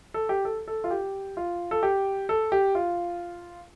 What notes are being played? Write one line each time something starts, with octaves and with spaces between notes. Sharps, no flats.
A4
G4
A4
A4
F4
G4
F4
A4
G4
A4
G4
F4